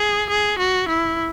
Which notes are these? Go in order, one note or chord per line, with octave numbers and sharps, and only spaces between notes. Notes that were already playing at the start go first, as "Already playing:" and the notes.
Already playing: G#4
G#4
F#4
E4